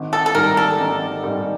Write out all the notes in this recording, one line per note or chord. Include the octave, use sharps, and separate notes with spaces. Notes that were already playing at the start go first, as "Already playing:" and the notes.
Already playing: G#1
A4
A4
G#2 D#3 G3 A#4
A4
G#1
G#2 D#3 G3